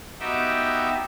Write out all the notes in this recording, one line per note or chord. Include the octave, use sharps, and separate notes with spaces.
B3 D#4 F#4 G4 E5 G5